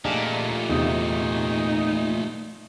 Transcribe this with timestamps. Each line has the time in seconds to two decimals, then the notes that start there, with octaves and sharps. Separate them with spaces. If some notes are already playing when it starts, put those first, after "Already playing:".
0.05 A#2 A3 D4 D#4 G4 G#4
0.70 E2 C3 D#4